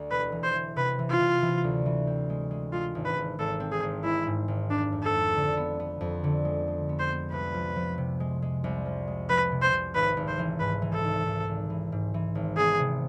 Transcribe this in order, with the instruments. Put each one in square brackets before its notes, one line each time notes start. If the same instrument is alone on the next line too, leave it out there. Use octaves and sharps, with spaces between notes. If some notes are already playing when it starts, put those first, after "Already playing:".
Already playing: [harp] D2
[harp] E1 [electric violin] B4
[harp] E3
[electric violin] C5
[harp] E3
[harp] C3 [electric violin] B4
[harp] E3
[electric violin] F4
[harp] C3
E3
D2
E3
C4
G#3
G#3
[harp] G#3 [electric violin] F4
[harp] G#1
[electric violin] B4
[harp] G#1
[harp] G#1 [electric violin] A4
[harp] C4
[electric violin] G#4
[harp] G#1
[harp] G#3 [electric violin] E4
[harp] G#2
G#1
[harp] F2 [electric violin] D4
[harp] F2
[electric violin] A4
[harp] F2
D3
B3
B3
F2
D3
G#3
G#3
B3
[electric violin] C5
[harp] B3
[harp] C2 [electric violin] B4
[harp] F3
F3
C3
G#3
G#3
C2
F3
G#3
[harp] F3 [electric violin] B4
[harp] C3
[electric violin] C5
[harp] C3
[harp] G#1 [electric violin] B4
[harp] G#1
[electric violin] C5
[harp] E3
[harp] G#2 [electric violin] B4
[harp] E3
[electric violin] A4
[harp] G#1
G#1
G#1
E3
G#2
E3
G#1
[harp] B3 [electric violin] G#4
[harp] C3